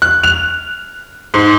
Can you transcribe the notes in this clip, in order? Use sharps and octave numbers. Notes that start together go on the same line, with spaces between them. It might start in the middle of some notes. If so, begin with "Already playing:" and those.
F#6
F7
G#2